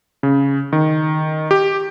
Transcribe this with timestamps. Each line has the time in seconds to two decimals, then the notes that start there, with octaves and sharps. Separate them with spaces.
0.23 C#3
0.73 D#3
1.51 G4